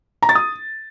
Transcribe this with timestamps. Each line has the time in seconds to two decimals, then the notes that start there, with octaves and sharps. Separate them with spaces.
0.22 A#5
0.29 A6
0.35 D#6